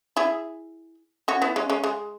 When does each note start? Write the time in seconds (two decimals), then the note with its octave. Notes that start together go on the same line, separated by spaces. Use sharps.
0.17 E4 G#4
1.28 C#4 F#4
1.42 B3 E4
1.56 G#3 C#4
1.70 G#3 C#4
1.84 G#3